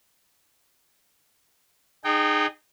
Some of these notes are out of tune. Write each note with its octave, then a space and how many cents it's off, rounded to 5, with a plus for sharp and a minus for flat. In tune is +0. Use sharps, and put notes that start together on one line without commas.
D#4 -30 G#4 -5 G5 -15